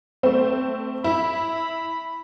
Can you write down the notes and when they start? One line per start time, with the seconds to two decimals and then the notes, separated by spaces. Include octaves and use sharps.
0.23 A3 C4
1.04 E4 B5